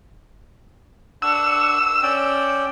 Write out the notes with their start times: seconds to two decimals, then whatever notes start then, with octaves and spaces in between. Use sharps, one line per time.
1.22 D4 F#5 C#6 E6
2.03 C#4 D5 G5